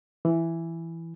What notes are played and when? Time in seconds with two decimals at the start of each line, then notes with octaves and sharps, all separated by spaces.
0.25 E3